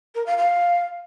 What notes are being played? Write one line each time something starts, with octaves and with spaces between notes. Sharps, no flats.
A#4
F5
F5